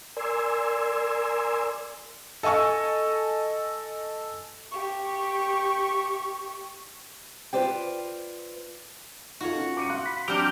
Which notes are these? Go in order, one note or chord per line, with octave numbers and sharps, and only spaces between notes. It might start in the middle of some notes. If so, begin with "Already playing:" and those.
A#4 D5 G#5 C6 E6
A4 D#5 G#5 C#6 E6
G4 C#6
F4 A4 B4 C5 D5 G5
D#4 F4 F#4 A4 C#5
C#4
D6 C#7 D#7
F5 C6 F#6
B5
F#3 C4 D4 G4 D6 F6 G6